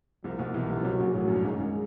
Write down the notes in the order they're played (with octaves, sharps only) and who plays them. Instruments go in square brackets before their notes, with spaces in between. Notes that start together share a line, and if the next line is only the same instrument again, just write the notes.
[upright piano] C2 C3 [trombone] F3
[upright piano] B1 B2
[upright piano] C2 C3 [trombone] E3
[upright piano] B1 B2
C#3
[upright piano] C2 C3 [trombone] F#3
[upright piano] A#1 A#2
[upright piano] A1 A2 [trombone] F#3
[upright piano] F#2
G2
[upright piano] G#1 G#2 [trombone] G#3
[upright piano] F#2